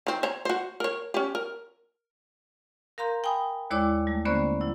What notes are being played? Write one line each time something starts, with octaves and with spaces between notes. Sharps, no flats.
D#3 C4
C5 C#5 A#5
F#4 C5
A#4 C#5
C#4 G4
A#4
A#4 F5 A#5 C6 G6
G5 G#5 B5 D#6
D#2 G#3 E4 C#5 D5 D6
G3 A3
D3 A#3 B3 C#4 C5 D5
F#3 E4